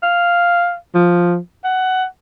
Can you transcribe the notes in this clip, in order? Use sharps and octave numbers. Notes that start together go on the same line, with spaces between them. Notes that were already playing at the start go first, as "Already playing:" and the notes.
F5
F3
F#5